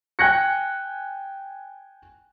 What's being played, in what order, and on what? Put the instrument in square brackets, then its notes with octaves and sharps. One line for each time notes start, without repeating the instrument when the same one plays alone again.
[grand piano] G5 G#5 F#6 G#6 A#6 C#7